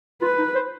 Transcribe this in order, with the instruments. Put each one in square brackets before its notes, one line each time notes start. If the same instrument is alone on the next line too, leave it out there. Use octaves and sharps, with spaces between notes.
[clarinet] F4 [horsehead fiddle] B4
[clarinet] D#4
C5